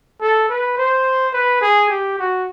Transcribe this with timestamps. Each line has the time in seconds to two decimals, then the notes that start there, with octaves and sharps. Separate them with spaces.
0.21 A4
0.49 B4
0.77 C5
1.33 B4
1.62 G#4
1.90 G4
2.18 F#4